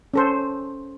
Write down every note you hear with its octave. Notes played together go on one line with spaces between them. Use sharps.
C#4 A4 C5